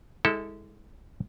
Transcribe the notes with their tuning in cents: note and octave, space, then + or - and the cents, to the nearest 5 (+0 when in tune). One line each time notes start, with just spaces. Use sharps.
G#3 -15 E4 -30 A4 +0